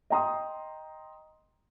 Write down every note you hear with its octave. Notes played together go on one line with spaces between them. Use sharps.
D#5 G5 A#5 C6 D#6